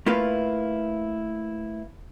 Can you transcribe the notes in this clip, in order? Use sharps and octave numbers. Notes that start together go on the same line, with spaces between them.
A3 A#3 E4 F4 B4